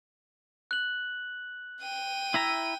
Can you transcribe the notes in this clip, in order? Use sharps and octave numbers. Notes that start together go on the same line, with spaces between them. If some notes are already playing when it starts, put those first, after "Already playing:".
F#6 F#7
G5 D#7
E4 E5 A#5